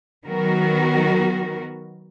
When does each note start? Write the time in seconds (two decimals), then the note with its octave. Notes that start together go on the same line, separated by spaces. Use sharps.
0.25 D#3 F#3 B3 F#4 A#4